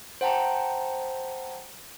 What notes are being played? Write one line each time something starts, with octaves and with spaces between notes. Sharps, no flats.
C5 F#5 G5 A5 A#5